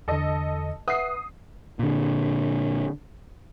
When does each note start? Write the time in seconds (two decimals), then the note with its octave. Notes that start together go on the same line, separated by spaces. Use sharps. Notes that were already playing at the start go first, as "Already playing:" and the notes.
0.08 E2 D3 A4 D#5
0.88 B4 E5 F#5 D#6 C7
1.79 A#2 D3